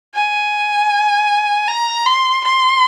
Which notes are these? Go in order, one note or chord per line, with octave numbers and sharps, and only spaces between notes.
G#5
A#5
C6
C6